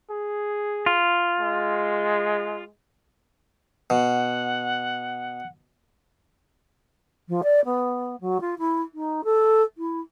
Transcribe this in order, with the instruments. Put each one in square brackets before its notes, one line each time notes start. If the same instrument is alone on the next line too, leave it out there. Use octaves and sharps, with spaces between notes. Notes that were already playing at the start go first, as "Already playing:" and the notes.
[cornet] G#4
[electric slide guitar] F4
[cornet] G#3
[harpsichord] B2 [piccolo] F#5
[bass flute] F3
D5
B3
F#3
F4
E4
D#4
A4
E4